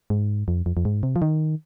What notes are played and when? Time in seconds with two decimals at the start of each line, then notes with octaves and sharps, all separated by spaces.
0.10 G#2
0.48 F2
0.66 F2
0.77 F2
0.85 G#2
1.03 C3
1.16 F3
1.22 D#3